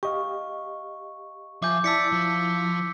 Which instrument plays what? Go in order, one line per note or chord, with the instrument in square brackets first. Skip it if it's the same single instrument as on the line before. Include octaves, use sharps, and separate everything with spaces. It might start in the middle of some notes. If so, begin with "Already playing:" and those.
[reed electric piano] G4 D#5 F5 [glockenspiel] C#6
[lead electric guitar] F3 [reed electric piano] E5 G#5 [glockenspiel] D6 G6
[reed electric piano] E4 A5 [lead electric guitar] D5 [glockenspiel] E6 B6 C#7
[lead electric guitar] F3